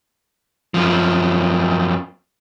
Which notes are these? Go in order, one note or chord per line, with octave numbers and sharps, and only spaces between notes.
F#2 F3